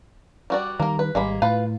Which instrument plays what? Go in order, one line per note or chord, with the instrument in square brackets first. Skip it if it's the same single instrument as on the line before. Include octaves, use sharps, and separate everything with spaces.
[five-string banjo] G3 F#4 D5
[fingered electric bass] D#3 G3 [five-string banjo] A#3 A#4
[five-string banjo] B4
[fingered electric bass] G#1 G3 [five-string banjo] G#3 A#3 B5
[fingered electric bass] A2 [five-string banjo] F4 B4 F5